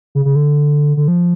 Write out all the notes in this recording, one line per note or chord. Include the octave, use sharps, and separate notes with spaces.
C#3
C#3
D3
D3
F3